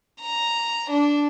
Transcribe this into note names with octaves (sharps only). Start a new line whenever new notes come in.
A#5
D4